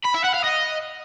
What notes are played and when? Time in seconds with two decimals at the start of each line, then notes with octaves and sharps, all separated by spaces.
0.05 B5
0.15 E5
0.24 F#5
0.34 F5
0.44 D#5